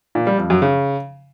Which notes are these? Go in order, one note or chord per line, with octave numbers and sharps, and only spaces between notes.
A#2
G3
F2
F#2
C#3